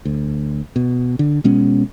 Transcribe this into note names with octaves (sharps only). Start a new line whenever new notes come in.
D2
B2
D3
B2 G#3 B3 C#4